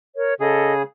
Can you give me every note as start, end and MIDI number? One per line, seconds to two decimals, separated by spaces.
0.15 0.34 70
0.15 0.34 73
0.40 0.82 49
0.40 0.82 68
0.40 0.73 69
0.40 0.73 75